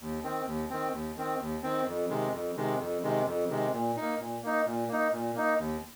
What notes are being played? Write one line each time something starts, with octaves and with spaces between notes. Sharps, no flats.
D#2
D#3 C4
D#2
D#3 C4
D#2
D#3 C4
D#2
D#3 C4
F2
C3 D#3 G#3
F2
C3 D#3 G#3
F2
C3 D#3 G#3
F2
C3 D#3 G#3
A#2
A#3 D#4
A#2
A#3 D#4
A#2
A#3 D#4
A#2
A#3 D#4
D#2